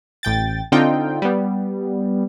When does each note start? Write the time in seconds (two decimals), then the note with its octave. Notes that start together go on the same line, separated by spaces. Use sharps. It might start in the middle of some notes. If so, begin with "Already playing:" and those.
0.23 A1 G5 A6
0.72 D3 C4 D#4 F4 G5
1.22 G3 B3